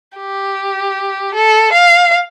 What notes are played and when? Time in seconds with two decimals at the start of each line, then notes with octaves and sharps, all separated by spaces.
0.18 G4
1.34 A4
1.73 F5